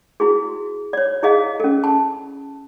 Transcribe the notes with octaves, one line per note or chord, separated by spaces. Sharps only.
E4 F#4 G#4
C#5 D5
E4 G#4 D#5 F5
C#4 A4
A5